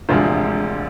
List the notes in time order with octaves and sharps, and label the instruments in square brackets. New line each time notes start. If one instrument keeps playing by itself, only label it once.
[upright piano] E1 D2 C3 F3 G#3 F4